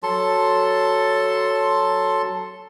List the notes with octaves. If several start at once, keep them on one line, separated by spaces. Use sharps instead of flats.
F#3 A4 A5 C6